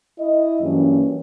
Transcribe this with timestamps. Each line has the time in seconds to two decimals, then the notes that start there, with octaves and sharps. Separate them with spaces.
0.19 E4 D#5
0.61 G2 E3 F#3 A#3 C#4